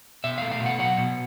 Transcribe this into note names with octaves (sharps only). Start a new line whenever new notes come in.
B2 E5
A3 F5
F5
B2
F#5
F#3 F#5
B2